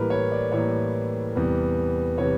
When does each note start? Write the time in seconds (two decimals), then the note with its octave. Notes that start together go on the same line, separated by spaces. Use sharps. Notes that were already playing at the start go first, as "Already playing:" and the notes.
Already playing: A2 E3 G3 A#3 A#4 B4
0.10 C#5
0.32 D5
0.52 A2 E3 G3 A#3 C#5
1.35 E2 C3 E3 G3 B3
2.18 C3 E3 G3 B3 C#5